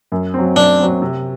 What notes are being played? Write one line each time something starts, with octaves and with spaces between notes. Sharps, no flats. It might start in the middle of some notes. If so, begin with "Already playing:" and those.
F#2
F#3 C4
F#2 D4
F#3 C4
C3